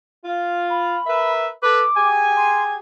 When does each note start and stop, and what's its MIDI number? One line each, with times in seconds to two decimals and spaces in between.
0.25 0.97 65
0.70 1.32 83
1.07 1.48 70
1.07 1.48 71
1.07 1.48 76
1.62 1.83 69
1.62 1.83 71
1.62 2.08 86
1.97 2.75 67
1.97 2.75 68
1.97 2.75 80
2.36 2.63 84